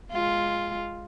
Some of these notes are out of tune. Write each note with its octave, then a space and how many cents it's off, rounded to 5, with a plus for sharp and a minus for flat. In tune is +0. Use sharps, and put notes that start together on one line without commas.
G#3 +0 F4 +0